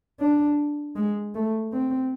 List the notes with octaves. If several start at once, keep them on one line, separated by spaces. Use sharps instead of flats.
D4
G#3
A3
C4